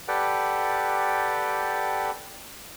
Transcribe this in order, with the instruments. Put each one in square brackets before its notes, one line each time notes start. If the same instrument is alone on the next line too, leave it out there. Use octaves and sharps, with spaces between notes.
[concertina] G4 A4 B4 D5 F#5 G5